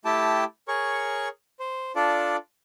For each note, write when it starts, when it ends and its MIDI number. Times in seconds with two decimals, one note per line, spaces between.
0.05 0.44 57
0.05 0.44 64
0.05 0.44 67
0.05 0.44 79
0.05 0.44 81
0.68 1.28 68
0.68 1.28 70
0.68 1.28 73
0.68 1.28 85
1.59 1.92 72
1.96 2.37 62
1.96 2.37 65
1.96 2.37 69
1.96 2.37 74